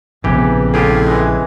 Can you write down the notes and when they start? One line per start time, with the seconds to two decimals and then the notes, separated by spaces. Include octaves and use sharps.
0.24 A#1 F2 C#3 E3 B3 G4
0.74 A2 F4 G4 G#4
1.07 E3 G#3